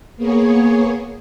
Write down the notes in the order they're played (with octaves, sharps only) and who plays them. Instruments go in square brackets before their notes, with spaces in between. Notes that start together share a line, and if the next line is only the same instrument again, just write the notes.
[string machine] A#3 B3 G#4 C#5